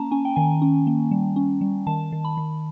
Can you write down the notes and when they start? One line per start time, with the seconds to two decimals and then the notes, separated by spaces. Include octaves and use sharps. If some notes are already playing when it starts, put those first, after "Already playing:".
Already playing: A#3 C#4 A5 A#5
0.11 C#4 G#5
0.25 G5
0.36 D#3 G#5
0.62 C#4
0.87 A#3
1.11 G3
1.36 C#4
1.61 G3
1.87 D#3 A5
2.12 D#3
2.24 B5
2.37 D#3